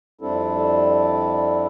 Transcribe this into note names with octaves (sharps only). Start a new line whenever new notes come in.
F2 G3 C4 D4 E4 A4